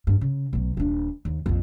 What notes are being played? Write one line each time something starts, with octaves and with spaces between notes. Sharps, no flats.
G2
C#3
B1 F#3
D#1 D4
D#2
A#1 F2